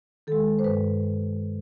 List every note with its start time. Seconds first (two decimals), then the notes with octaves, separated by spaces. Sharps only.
0.27 D#3 G#3 A4
0.59 C5
0.64 G2 B4